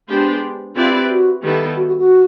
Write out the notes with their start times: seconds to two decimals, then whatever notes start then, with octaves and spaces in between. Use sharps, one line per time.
0.09 G#3 B3 D4 G4 C5
0.76 C4 E4 F4 G4 B4 D5
1.09 F#4
1.43 D#3 G3 B3 E4 A4
1.77 F#4
1.88 F#4
1.99 F#4